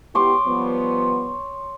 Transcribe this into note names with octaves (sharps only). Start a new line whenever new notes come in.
B3 E4 G4 C#5 C6 D6
F3 G3 B3